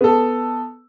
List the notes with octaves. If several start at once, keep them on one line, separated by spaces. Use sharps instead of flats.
B3 A4